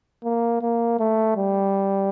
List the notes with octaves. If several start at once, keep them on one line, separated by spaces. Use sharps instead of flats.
A#3
A#3
A3
G3